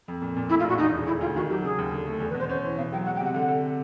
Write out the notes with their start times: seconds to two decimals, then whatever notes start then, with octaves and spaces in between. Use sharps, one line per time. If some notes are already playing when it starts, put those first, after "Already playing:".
0.08 F2
0.22 A#2
0.36 A#2
0.49 A2 E4
0.60 F4
0.64 A#1 F#4
0.78 E2 D#4
0.92 E1
1.06 D2 E4
1.21 D2 F4
1.36 D#3 F#4
1.50 F#3 G4
1.63 C#3 G#4
1.78 D#2
1.92 D3
2.07 A3
2.20 E2 A4
2.30 B4
2.34 B2 C5
2.49 C#4 C5
2.64 E3
2.77 B2 F5
2.92 F#3 G5
3.05 G#3 F#5
3.16 G5
3.20 C3 F#5
3.34 D3 F#5
3.49 D3